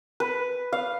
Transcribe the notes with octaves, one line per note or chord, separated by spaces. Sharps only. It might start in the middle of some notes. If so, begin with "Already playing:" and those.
B4
F5